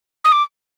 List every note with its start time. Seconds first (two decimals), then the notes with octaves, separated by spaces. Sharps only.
0.24 D#6
0.32 D6